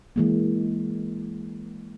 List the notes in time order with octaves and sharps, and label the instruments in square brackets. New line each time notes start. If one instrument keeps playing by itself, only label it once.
[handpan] E3 G#3 A#3